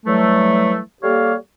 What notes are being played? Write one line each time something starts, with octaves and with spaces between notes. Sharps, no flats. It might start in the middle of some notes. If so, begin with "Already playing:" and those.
E3 F#3 G3 A3
G3 A#3 G4 A4 C#5 F5